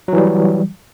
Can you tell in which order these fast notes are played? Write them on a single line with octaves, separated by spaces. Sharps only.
F#3 E3 G3